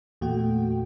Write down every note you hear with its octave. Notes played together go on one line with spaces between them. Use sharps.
E2 A#2 A3 F#4 G5